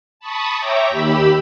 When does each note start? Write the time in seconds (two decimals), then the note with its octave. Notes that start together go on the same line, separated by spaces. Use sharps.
0.20 A5 B5 C#6 D#6
0.58 C#5 E5 G5 A#5 D6
0.90 D#2 G4 B5 E6